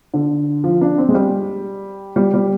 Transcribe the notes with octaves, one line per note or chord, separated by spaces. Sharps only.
D3
F3
D4
C4
G#3
G3
G3
G3